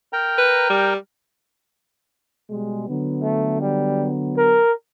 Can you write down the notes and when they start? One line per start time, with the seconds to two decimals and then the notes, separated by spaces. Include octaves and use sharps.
0.13 A#4 G5 A#5
0.38 B4
0.70 G3
2.50 B2 G3 G#3
2.89 D3 F#3 B3
3.23 A3
3.60 G3
4.38 A#4